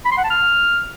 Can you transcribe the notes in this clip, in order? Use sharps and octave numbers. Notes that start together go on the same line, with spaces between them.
B5
C6
F#5
A5
F6